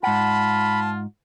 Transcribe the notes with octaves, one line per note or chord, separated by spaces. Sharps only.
G#2 F4 F#5 A5 B5